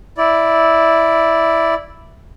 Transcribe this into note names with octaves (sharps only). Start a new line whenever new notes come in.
E4 D5